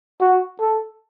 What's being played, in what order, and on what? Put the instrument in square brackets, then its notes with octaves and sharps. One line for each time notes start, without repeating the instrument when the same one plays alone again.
[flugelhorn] F#4
A4